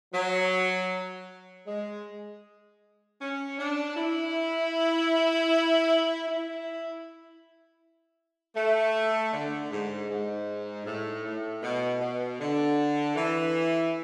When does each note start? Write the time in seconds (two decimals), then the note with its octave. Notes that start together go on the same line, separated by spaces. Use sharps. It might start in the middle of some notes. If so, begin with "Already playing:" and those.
0.14 F#3
1.66 G#3
3.20 C#4
3.58 D4
3.97 E4
6.27 E4
8.56 A3
9.33 D3
9.71 G#2
10.10 G#2
10.85 A2
11.24 A2
11.62 B2
12.01 B2
12.39 D3
13.16 E3